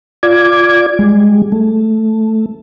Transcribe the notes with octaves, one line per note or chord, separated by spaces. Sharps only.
F4 D5 D6 G#6
G3 G#3
A3